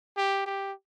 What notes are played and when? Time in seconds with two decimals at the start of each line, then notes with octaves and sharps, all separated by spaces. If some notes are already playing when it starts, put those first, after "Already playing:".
0.17 G4
0.46 G4